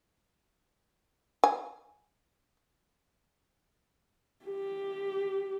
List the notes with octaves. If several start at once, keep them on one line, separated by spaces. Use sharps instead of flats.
G#5
G4